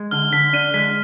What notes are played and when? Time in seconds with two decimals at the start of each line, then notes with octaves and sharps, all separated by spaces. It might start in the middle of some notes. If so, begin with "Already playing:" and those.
Already playing: G#3
0.11 D3 F6
0.33 D3 B6
0.53 D4 D#7
0.74 G#3 B6